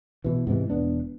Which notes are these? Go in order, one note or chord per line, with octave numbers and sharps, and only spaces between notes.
B2 E3
G#2 C3 E3 G#3
E1 B3 D4